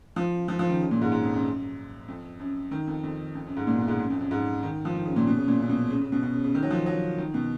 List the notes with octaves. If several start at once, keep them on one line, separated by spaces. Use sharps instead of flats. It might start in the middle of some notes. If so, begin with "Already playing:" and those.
F3
F3
F3
D#3
C#3
A#2
G#2
G#2
F2
F#2
F2
F#2
D#3
F2
F2
F2
F#2
G#2
A#2
B2
G#2
F#2
F2
F#2
G#2
D#3
F3
D#3
C#3
A#2
B2
C#3
A#2
F#2
B2
C#3
C#3
B2
B2
C#3
C#3
D#3
F#3
F3
F#3
D#3
B2